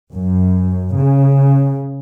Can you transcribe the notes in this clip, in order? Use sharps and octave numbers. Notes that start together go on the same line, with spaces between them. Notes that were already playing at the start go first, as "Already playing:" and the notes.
F#2
C#3